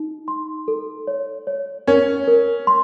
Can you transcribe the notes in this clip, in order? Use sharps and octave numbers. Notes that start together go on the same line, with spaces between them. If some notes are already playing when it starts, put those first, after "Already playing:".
Already playing: D#4
C6
A4
C#5
C#5
C#4 A#4
A#4
C6